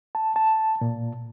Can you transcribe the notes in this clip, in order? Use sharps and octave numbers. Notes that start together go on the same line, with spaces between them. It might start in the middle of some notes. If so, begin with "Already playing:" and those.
A5
A5
A#2